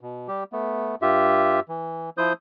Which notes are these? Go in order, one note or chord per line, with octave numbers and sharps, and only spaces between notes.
B2
G3 G4
A3 B3
G2 F4 G4 E5
E3
F3 E4 C5 D#6 G6